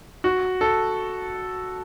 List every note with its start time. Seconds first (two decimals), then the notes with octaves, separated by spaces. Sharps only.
0.24 F#4
0.61 A4